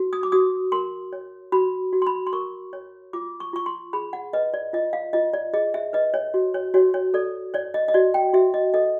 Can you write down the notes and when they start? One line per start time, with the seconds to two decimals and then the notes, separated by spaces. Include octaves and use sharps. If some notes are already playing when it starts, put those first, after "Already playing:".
Already playing: F#4
0.13 D#6
0.23 D6
0.32 F#4 D#6
0.72 A#4 C6
1.13 C#5
1.52 F#4 B5
1.93 F#4
2.02 C6
2.07 B5
2.27 C6
2.33 A#4 C#6
2.73 C#5
3.13 F4 D6
3.40 C#6
3.53 F4 C#6
3.66 C6
3.93 G#4 B5
4.13 F#5
4.33 B4 D#5
4.54 D5
4.73 F4 D#5
4.93 F5
5.13 F4 D#5
5.33 D5
5.53 G#4 D#5
5.74 E5
5.93 B4 D#5
6.14 C#5
6.34 F#4
6.54 C#5
6.74 F#4 C#5
6.94 C#5
7.14 A4 D5
7.54 C#5 D5
7.74 D#5
7.88 D#5
7.94 F#4 D5
8.14 G5
8.34 F#4 E5
8.54 D#5
8.74 A4 D#5